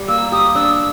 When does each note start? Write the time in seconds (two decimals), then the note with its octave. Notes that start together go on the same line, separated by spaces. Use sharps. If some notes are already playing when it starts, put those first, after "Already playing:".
Already playing: G3
0.08 A#3 E6
0.32 G4 D#6
0.55 D4 E6